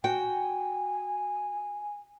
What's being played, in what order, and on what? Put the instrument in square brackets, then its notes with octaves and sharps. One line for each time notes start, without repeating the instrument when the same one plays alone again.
[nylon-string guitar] F#4 G5 [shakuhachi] G#5